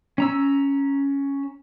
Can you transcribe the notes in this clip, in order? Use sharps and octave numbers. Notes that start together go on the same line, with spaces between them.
C#4 A#5 E6